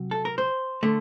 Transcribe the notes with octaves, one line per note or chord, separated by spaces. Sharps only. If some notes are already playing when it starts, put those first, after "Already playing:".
Already playing: C3 F#3
A4
A#4
C5
D3 A3